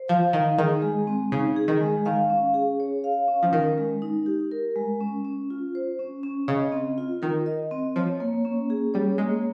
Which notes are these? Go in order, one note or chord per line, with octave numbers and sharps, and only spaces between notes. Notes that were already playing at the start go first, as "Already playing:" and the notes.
Already playing: C5
F3 F5
D#3 D#4
D#3 G#4
G#3
C4
C#3 D#4
G#4
D#3
G#3
D#3 F5
C#4
G#4
C#5
F5
C#4
F3
D#3 A#4
G#3
D#4
G4
A#4
G#3
C#4
C#4
F4
C5
C#4
C#4
C#3 D#5
C4
F4
D#3 A#4
D#5
C4
F3 C#5
A#3
C#4
G#4
G3 C#5
G#3 A#3